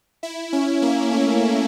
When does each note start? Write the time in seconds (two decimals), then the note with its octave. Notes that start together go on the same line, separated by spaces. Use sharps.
0.23 E4
0.53 C#4
0.82 A#3
1.11 A3